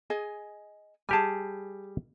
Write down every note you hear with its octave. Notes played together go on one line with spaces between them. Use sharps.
G#4 D#5 G#5
G3 G4 G#4 G#5 A5